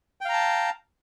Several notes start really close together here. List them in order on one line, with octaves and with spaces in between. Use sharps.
G5 F5 A#5 A5